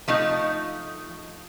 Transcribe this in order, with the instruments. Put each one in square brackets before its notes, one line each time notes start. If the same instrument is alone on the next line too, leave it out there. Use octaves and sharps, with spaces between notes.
[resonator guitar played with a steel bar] F3 A3 D#4